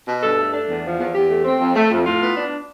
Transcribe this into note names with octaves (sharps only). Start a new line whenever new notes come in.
B2
G2 A4
A3
D4
E2
F3
E2
E2 G4
A3
C4
F2
A3
F2
A2 F4
B3
D4